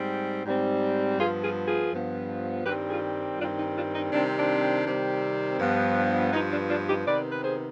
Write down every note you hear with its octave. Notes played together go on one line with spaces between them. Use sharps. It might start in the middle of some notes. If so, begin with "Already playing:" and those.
Already playing: G#2 G3 C4
G#2 G3 C4
G2 F3 B3 F4 G#4
F4 G#4
F4 G#4
G2 F3 B3
G2 D#3 G3 C4 G4 B4
F4 G#4
G2 D#3 G3 C4 D4 F4
D#4
D4 F4
D#4
C3 D#3 G3 C4 D4
D4
C3 D#3 G3 C4
G2 F3 B3
G2 F3 B3 D#4
D4 F4
D4 F4
D#4 G4
C3 D#3 B3 B4 D5
B4
G#4 C5